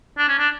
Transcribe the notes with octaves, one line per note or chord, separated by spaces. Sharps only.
D4
C#4
D4